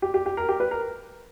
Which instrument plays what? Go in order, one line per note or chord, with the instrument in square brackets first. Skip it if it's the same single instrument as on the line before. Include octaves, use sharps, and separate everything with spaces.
[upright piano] G4
G4
G4
A#4
G4
B4
A#4